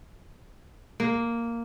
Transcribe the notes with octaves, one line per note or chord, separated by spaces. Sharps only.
A#3